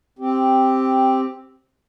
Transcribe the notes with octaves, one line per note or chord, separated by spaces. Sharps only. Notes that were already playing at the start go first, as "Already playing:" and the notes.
C4 G4